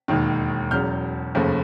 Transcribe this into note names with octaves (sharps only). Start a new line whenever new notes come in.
E1 D#2 D#3
E1 E2 C#3 F#3 F6 G6
F1 D#2 C#3 F3 A3